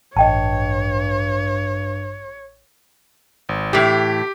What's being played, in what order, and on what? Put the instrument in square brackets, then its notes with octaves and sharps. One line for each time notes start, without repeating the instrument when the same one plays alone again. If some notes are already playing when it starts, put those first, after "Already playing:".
[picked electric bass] A1 [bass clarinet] G2 [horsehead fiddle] C#5 [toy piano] D#5 G5 A5
[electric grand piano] G#1
[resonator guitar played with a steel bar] A2 E3 [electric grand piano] G4